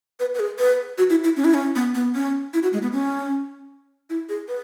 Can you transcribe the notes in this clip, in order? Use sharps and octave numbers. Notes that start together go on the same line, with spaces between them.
B4
B4
G#4
B4
F#4
E4
E4
C#4
E4
C#4
B3
B3
C#4
E4
F#4
G#3
B3
C#4
E4
G#4
B4